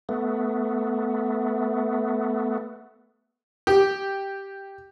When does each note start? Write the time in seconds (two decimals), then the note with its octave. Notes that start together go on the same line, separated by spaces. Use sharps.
0.09 A3 B3
3.67 G4